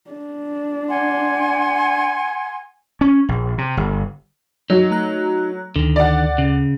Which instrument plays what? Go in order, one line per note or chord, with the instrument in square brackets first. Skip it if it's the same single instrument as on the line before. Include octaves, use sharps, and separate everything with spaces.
[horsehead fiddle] D4
[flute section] F#5 G#5 C6
[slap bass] C#4
A#1
C3
G1
[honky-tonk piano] F#3 [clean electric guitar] D#4
[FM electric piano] A3 A#5 F#6
[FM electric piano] D2 [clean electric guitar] D3 D#3
[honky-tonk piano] D5 F#5
[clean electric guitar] C#3